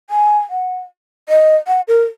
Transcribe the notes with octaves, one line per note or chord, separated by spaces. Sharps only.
G#5
F#5
D#5
F#5
A#4